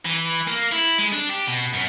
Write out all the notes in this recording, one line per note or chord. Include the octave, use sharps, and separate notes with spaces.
E3
A#3
E4
G#3
D4
G4
B2
F#2